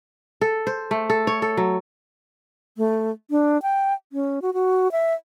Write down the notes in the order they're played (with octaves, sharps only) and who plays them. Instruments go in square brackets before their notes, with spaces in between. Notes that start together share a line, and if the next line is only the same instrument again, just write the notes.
[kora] A4
C5
A3
A4
C#5
A4
F#3
[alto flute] A3
D4
G5
C#4
F#4
F#4
E5